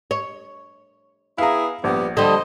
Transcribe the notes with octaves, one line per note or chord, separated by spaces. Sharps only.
C#5
B3 E4 G#4 F5 A#5
A#1 G3 B3
D3 G3 C5 D#5